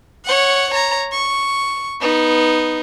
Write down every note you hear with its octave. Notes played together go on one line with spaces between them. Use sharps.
C#5 F#5
C#5 A#5
C#6
B3 D#4